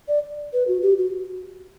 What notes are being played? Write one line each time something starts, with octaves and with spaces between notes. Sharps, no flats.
D5
B4
F#4
G4
F#4